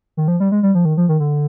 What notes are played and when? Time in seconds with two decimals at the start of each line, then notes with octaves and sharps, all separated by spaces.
0.17 D#3
0.28 F3
0.40 G3
0.52 G#3
0.63 G3
0.75 F3
0.85 D#3
0.97 F3
1.09 D#3
1.20 D3